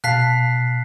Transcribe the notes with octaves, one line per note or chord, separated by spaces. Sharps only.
B2 F5 A5 F#6 B6 C7